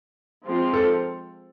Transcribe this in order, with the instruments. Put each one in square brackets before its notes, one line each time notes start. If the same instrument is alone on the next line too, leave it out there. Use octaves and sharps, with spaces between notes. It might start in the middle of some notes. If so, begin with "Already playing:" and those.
[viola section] F3 G#3 C4 F4
[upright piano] A4